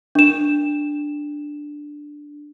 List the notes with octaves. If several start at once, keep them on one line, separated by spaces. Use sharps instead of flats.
D4 E7